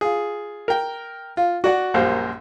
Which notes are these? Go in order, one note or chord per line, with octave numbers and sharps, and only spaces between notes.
F4 G#4
A#4 G5
F4
F#4 D5 F#5
A#1 F#2 G3 A#4 C5 F5